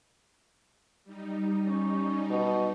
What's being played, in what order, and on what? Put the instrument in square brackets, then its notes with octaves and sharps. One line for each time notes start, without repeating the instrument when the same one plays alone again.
[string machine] G3 D#4
[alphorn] C#4
B2